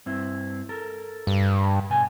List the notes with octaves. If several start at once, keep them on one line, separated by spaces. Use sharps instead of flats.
G2 C4 E4
A4 A#4
G2
B2 G#5